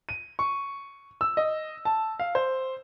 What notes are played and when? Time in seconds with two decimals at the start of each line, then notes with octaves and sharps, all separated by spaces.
0.09 D#7
0.39 C#6
1.21 E6
1.37 D#5
1.85 A5
2.20 F5
2.35 C5